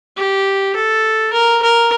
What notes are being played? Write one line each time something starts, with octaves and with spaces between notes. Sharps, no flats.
G4
A4
A#4
A#4